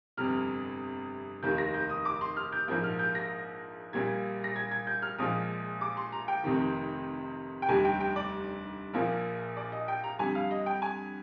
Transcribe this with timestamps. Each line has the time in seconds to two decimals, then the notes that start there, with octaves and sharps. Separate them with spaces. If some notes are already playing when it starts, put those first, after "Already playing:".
0.17 G1 F2 C3 F6
1.43 F1 D#2 D#3 A#3 G6
1.58 A#6
1.74 G6
1.89 D#6
2.05 D6
2.21 C6
2.37 F6
2.52 G6
2.68 A#1 G#2 F3 A#3 G6
2.83 F6
2.99 G6
3.15 A#6
3.93 A#1 A#2 G3 A#3 G#6
4.44 A#6
4.56 G#6
4.71 G#6
4.87 G6
5.02 F6
5.18 A#1 A#2 F3 G#3 D#6
5.81 D6
5.97 C6
6.12 A#5
6.28 G5
6.44 F1 F2 C3 D#3
7.62 G5
7.68 F1 D#2 D3 G3 G#5
7.85 G5
8.00 G5
8.16 D5
8.93 A#1 A#2 F3 A#3
9.57 D5
9.72 D#5
9.88 G5
10.04 A#5
10.19 F2 D3 G3 G#5
10.35 F5
10.51 D#5
10.66 G5
10.82 G#5